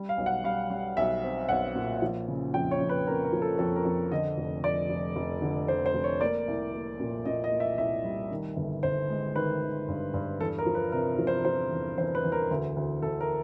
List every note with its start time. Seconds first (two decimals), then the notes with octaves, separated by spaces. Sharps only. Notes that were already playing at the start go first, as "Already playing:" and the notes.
Already playing: G3
0.09 F5
0.18 B1
0.26 F#5
0.44 G3 F5
0.70 G3
0.97 B1 E5
1.24 C4
1.49 B1 F#5
1.75 A#2
2.02 F3
2.28 C#3
2.54 F2 G5
2.71 C#5
2.80 F2
2.89 B4
3.07 F2 A#4
3.24 A#4
3.33 F3
3.42 A4
3.59 F2 A4
3.76 A#4
3.85 F2
4.11 D3 D#5
4.38 F1
4.64 F1 D5
4.89 F1
5.16 F1
5.42 D3
5.68 D3 C5
5.86 C5
5.95 F1
6.04 C#5
6.21 A#3 D5
6.48 C2
6.73 A#3
7.00 A#2
7.25 A#2 D#5
7.44 D#5
7.52 A#3
7.60 E5
7.78 C2 E5
8.04 G3
8.30 D#3
8.56 G1
8.83 G1 C5
9.10 G#3
9.35 D#3 B4
9.61 D#3
9.88 G2
10.14 G2
10.40 E2 A4
10.58 A#4
10.66 F3
10.75 B4
10.92 C3 A#4
11.18 F3
11.27 C5
11.45 F3 C5
11.71 E2
11.98 E2 C5
12.15 B4
12.24 E2
12.32 A#4
12.51 D2
12.77 D2
13.02 D2 A4
13.21 A#4